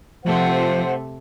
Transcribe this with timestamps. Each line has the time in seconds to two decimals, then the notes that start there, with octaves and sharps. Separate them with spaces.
0.25 C3 F3 A3 C5 F#5